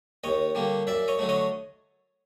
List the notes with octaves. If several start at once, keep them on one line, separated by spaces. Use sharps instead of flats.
D#2 C#5 D#5
D3 G3 A#3
F#2 D5 E5
C#5 D#5
D3 F#3 A3
C#5 D#5